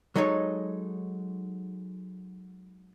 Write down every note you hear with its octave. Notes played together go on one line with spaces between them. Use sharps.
F#3 G#3 D#4 A4 C#5